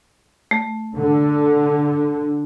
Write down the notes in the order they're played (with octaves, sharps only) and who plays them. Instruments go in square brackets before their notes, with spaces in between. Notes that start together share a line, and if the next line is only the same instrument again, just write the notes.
[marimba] A3
[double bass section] D3